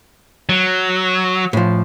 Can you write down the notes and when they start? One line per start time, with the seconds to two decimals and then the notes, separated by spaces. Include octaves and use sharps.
0.49 F#3
1.53 A2 F3